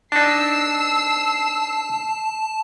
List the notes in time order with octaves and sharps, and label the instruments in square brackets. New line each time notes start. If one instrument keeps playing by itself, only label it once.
[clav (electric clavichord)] D4 D#4 [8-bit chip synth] A5 [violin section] E6 C7